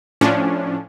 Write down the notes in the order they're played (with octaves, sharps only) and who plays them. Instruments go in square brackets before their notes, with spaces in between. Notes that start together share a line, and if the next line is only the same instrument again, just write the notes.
[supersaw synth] A2 F3 C#4 D4